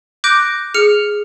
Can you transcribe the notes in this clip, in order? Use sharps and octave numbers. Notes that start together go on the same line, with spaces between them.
D6 F#6 G6 A#6 D7
G#4 F6 C#7